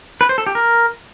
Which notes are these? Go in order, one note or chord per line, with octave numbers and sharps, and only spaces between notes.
B4
C5
A4
G4
A#4